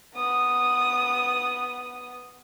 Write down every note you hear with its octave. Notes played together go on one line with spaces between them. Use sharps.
B3 D#6